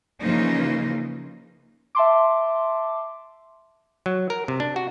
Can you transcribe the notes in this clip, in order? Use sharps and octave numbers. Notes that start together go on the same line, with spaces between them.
C#3 E3 F3 A#3 D#4 F4
E5 A5 C6 D6
F#3
A#4
C3
D4
F#4